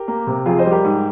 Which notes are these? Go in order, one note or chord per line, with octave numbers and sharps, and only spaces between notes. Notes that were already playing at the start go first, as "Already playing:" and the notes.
Already playing: G4 A#4
A#3
C3
F2 F4 G#4
C5 D#5
G3
G4 A#4
G#2